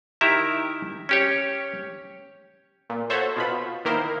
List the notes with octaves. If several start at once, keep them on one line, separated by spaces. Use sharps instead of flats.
D#3 E4 G4 E5 A#5
C#4 G4 C#5
A#2
F#4 A4 C5 C#5 E5
B2 F4 B5
D#3 A#3 E4 A#4 C5